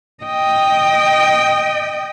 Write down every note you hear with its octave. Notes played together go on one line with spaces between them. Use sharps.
D#5 G5